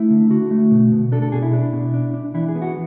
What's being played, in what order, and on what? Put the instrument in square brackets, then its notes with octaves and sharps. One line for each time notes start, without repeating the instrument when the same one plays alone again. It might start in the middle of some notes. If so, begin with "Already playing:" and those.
Already playing: [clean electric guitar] A3 E4
D3
D3 F#4
A3
B2
B2
D4 A4
A4
B2 G#4
E4
D4
B2
D4
D4
E3 E4
G#4
B3
F#4